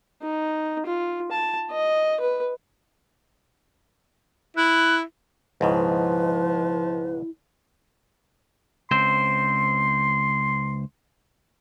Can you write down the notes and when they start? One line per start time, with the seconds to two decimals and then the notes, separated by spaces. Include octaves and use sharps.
0.22 D#4
0.86 F4
1.31 A5
1.71 D#5
2.20 B4
4.57 E4 F#6
5.61 C#2 G#2 B2 F3 E4 B4
8.91 C#2 C4 C5 C6